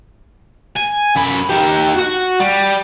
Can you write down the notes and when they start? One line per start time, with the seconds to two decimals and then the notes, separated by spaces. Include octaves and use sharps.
0.76 G#5
1.16 F#2 B5
1.49 D#4 G4
1.94 F#4 F#5
2.40 G3